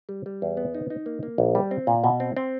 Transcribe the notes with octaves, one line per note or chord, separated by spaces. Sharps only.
G3
G3
E2
B3
D#4
D#4
A#3
A#3
A#1
G3
C4
A#2
B2
C4
C4